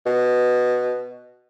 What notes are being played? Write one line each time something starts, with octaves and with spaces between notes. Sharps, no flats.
B2